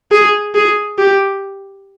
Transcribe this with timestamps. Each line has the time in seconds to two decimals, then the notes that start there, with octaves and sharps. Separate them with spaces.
0.11 G#4
0.55 G#4
0.98 G4